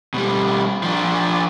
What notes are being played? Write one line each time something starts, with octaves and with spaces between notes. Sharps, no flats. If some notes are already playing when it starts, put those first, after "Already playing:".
B2 G3
F3 D4